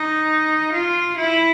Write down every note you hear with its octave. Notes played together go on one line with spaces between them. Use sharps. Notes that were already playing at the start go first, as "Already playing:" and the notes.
Already playing: D#4
F4
E4